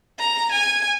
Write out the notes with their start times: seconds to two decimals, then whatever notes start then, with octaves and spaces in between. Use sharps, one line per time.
0.19 A#5
0.52 G#5